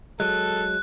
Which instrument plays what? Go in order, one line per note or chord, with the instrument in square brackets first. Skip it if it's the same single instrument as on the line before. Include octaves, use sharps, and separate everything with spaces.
[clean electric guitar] F#3 G#3 [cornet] A4 [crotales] F#6